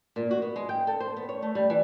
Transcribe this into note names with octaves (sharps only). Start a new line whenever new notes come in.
A#2
F#4
B3
G#3
G5
A4
C5
B3
C#5
A3
G3
E3